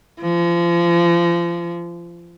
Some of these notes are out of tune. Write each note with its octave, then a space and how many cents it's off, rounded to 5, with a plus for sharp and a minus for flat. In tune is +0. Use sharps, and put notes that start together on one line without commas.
F3 -30